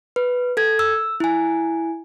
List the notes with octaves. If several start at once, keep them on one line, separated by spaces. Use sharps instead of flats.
B4
A4 G#6
E6
E4 G#5